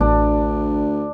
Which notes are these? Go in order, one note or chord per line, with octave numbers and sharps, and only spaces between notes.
A1 D2 D4